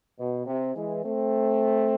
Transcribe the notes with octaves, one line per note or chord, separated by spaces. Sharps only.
B2
C3
E3 G#3
A3 C4